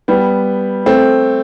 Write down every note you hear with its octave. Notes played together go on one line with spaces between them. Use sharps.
G3 B3
A3 C4